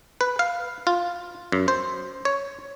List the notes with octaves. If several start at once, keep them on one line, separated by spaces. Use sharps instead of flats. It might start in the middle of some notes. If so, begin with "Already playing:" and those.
B4
F5
F4
F#2
C5
C#5